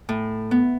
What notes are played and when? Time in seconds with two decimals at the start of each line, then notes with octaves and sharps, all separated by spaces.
0.09 A2
0.51 B3